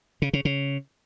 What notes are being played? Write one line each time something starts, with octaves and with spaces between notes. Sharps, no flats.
C#3
C#3
C#3